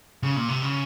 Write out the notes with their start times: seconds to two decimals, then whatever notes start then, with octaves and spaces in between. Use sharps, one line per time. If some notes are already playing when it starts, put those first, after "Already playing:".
0.23 C#3
0.36 A#2
0.49 C3
0.62 C#3